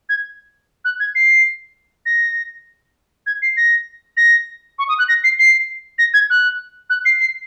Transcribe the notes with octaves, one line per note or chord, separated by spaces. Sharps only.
G#6
F#6
G#6
C7
A#6
G#6
C7
A#6
A#6
C#6
D#6
F#6
A#6
C7
C7
A#6
G#6
F#6
F#6
C7
C7